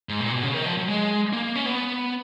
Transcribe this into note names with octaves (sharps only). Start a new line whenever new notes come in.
G#2
A#2
B2
C#3
D#3
F3
F#3
G#3
A#3
C#4
B3